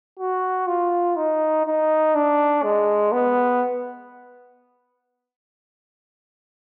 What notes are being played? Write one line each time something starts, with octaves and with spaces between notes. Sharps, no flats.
F#4
F4
D#4
D#4
D4
G#3
B3